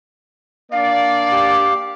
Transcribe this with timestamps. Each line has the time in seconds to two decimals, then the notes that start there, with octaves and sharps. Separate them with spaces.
0.72 A#3 D4 D5 F5
1.32 G4